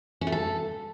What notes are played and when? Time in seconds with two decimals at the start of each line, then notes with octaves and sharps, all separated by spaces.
0.21 C#4
0.27 A3
0.32 A4